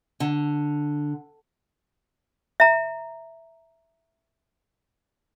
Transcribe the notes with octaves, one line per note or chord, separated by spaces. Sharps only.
D3
E5 A#5